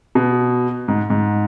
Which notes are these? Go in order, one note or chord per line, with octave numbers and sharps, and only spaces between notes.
B2
G#2
G#2